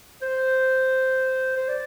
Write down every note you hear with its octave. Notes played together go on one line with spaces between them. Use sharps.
C5
C5
D5